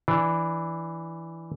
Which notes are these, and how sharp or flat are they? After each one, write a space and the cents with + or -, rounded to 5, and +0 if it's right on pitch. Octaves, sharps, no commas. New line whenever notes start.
E3 +0 D4 +0